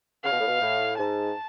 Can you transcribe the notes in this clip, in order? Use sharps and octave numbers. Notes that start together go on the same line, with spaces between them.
C#3 F5
B2
A2
B2
A2
G#2 A5